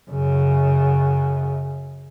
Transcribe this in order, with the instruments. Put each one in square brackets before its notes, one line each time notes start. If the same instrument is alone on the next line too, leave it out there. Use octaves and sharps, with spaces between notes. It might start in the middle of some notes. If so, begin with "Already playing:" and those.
[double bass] F#2 C#3